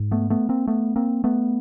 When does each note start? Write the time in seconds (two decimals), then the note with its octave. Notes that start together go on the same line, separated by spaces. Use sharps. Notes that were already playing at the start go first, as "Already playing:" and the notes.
Already playing: G#2
0.11 A3 B3
0.30 A3 B3
0.49 A#3 C4
0.67 A3 B3
0.96 A#3 C4
1.24 A3 B3